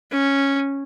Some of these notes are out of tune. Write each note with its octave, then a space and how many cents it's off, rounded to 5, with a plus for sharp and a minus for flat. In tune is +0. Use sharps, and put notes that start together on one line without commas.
C#4 -5